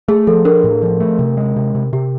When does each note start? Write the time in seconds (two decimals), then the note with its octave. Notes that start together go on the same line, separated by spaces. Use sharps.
0.08 A3 G#4
0.27 F3 A4
0.45 D4 A#4
0.64 A2
0.82 F3
1.00 A3
1.19 C3
1.37 G#3
1.56 C3
1.75 C3
1.93 C3 G4